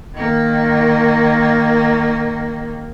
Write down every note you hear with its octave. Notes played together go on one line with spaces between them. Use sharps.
D#3 A#3